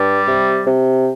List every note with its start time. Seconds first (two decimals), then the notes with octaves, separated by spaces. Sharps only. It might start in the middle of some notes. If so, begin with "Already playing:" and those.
Already playing: G2 G3
0.27 C3
0.65 C3